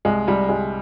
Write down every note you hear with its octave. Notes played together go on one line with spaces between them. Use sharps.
C2 G#3
C2 G3
C2 G#3